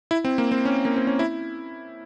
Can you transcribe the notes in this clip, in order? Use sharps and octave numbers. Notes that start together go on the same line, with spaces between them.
E4
C4
A#3
C4
C#4
A#3
C4
C#4
E4